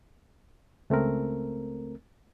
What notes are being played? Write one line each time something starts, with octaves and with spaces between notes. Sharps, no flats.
C#2 A3 C4 A#4